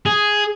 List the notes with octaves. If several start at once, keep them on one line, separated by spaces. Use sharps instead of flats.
G#4